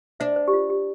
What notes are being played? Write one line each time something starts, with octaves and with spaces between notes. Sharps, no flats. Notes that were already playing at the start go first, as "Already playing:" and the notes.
D4 C5 E5
C5
G4
F4
G4